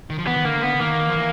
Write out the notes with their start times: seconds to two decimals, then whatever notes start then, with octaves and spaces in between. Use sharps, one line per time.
0.10 D#3
0.18 F3
0.27 E3 B3
0.36 D#3
0.45 D3 A#3
0.63 B3
0.80 D#3 A#3
1.08 F3
1.16 E3